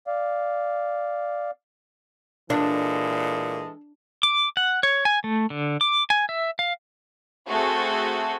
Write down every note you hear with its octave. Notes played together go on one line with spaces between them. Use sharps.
D5 F5
A#2 E3 G#3 D4 A4
D6
F#5
C#5
G#5
A3
D3
D6
G#5
E5
F5
A3 C4 F#4 G#4 A4